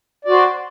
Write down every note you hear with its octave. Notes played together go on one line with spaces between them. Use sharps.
F#4 C5 D5